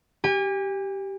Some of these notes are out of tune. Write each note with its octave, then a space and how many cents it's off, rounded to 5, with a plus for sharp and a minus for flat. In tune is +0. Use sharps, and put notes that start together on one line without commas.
G4 -10 G#5 -40